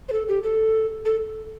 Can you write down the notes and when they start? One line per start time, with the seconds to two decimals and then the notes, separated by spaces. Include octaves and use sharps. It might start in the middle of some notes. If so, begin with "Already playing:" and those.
0.09 C5
0.12 A4
0.28 G4
0.43 A4
1.05 A4